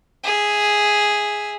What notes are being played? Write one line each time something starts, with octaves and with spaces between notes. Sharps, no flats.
G#4 E5